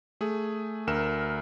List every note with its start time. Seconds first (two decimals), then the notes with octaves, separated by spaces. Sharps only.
0.21 A3 G#4
0.87 D2 A#4 E7